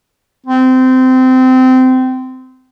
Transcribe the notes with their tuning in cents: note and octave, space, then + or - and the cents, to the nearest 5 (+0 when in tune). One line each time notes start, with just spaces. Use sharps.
C4 -20